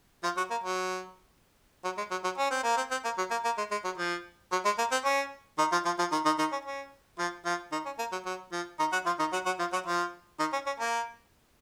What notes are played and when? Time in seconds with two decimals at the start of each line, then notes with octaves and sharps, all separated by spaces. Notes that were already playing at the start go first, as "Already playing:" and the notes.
0.24 F3 F4
0.37 F#3 F#4
0.50 A#3
0.64 F#3
1.84 F#3
1.98 G#3
2.11 F#3
2.24 F#3
2.38 C#4
2.51 C4
2.63 A#3
2.77 C4
2.91 C4
3.04 A#3
3.18 F#3
3.31 A#3
3.45 A#3
3.58 G#3
3.71 G#3
3.84 F#3
3.98 F3
4.52 F#3
4.65 G#3
4.78 A#3
4.92 C4
5.05 C#4
5.58 D#3 D#4
5.72 F3 F4
5.85 F3 F4
5.99 F3 F4
6.12 D#3 D#4
6.25 D#3 D#4
6.39 D#3 D#4
6.52 C#4
6.65 C#4
7.19 F3 F4
7.45 F3 F4
7.72 D#3 D#4
7.86 C#4
7.99 A#3
8.12 F#3
8.26 F#3
8.52 F3
8.79 D#3 D#4
8.93 F#3 F#4
9.06 F3 F4
9.19 D#3 D#4
9.33 F#3 F#4
9.46 F#3 F#4
9.59 F3 F4
9.73 F#3 F#4
9.86 F3 F4
10.39 D#3 D#4
10.53 C#4
10.66 C#4
10.80 A#3